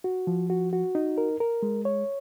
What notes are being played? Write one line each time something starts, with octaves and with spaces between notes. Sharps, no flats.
F#4
F3
F#4
F#4
D#4
A#4
A#4
G#3
C#5